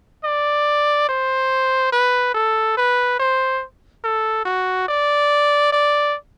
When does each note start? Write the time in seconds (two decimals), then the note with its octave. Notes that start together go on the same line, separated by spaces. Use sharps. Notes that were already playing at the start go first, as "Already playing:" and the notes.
0.24 D5
1.09 C5
1.92 B4
2.34 A4
2.77 B4
3.19 C5
4.04 A4
4.45 F#4
4.88 D5
5.72 D5